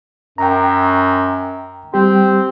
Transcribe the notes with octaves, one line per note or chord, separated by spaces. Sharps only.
F#2 G5 A#5
G3 C4 G4